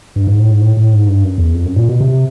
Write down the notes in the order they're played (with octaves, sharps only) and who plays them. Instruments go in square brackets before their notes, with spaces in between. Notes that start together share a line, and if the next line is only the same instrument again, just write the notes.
[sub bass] G2
G#2
A2
G#2
A2
A2
G#2
G2
F#2
E2
F2
F#2
A#2
B2
C3